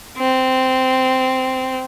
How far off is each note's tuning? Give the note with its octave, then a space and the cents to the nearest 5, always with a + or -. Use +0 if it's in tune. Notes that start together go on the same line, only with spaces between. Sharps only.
C4 -10